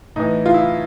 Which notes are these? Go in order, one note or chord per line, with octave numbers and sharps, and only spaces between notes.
A2 E3 D#4
F4
E4